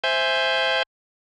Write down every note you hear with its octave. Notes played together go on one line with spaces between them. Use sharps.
C5 E5 G#5 G6